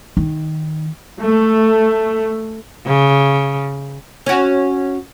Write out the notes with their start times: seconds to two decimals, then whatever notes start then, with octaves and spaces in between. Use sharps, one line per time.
0.17 D#3
1.21 A3
2.86 C#3
4.26 C#4 F#4